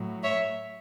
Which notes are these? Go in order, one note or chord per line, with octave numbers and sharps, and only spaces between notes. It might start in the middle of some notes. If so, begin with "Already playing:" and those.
Already playing: A2 F#3
C#5 E5